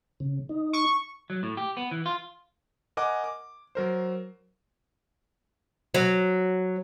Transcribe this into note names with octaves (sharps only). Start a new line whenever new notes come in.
C#3
D#4
C#6
F#3
A2
G4
B3
E3
F4
A#4 D#5 F#5 G#5 D6
D6
F#3 A#4 C5
F#3